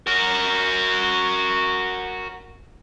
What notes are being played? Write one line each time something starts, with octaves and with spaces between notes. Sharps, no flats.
F#4 A#4